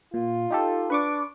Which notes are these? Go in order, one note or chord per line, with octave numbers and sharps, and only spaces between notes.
A#2 F4
D#4 G4 A4
D4 B4 C#6 D6